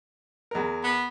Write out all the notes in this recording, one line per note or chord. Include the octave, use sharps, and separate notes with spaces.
E2 A#4
B3